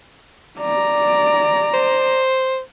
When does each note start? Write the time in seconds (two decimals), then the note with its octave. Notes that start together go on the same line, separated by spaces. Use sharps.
0.59 D5 A#5
1.74 C5